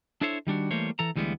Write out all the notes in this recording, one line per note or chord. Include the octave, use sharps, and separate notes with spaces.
D4 E4 A4 C5 C#5 E5
D#3 G3 D4 F#4
E3 G3 A3 A#3 C5 C#5
E3 A4 A#5
D2 E3 G3 G#3 B3